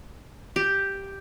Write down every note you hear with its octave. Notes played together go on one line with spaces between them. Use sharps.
G4